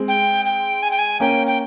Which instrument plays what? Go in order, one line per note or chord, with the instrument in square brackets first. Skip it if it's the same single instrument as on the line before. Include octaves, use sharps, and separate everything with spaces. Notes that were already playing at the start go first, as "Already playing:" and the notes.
Already playing: [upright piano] G#3 C4
[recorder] G5
G5
G#5
G5
G#5
[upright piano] A#3 C#4 [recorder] G5
[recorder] G5